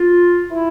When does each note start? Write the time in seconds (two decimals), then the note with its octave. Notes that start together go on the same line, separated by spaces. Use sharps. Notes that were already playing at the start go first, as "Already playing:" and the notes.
Already playing: F4
0.50 E4